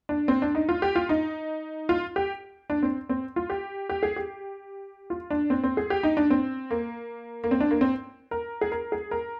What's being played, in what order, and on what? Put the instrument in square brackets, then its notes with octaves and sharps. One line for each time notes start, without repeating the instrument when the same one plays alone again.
[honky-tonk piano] D4
C4
D4
D#4
F4
G4
F4
D#4
F4
G4
D4
C4
C4
F4
G4
G4
G#4
G4
F4
D4
C4
C4
G#4
G4
D#4
D4
C4
A#3
A#3
C4
D4
A#3
C4
A#4
G#4
A#4
G#4
A#4